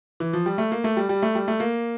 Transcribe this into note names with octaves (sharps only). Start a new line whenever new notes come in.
E3
F3
G3
A3
A#3
A3
G3
G3
A3
G3
A3
A#3